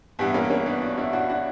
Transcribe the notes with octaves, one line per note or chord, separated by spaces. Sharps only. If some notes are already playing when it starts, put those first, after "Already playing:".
G2 E3 G3 B3
A#3 C#4
A#3 C#4
B3 D4
D4 F#4
C#4 E4
D4 F#4
D4 F#4